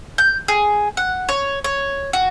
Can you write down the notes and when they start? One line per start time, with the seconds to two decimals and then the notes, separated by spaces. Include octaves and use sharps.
0.18 G6
0.48 G#4
0.97 F#5
1.29 C#5
1.64 C#5
2.13 F#4